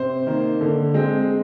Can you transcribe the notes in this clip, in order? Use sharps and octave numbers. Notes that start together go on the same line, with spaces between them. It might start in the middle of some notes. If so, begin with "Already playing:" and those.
Already playing: C3 C5
D#3 A#3
D3
G#3 C4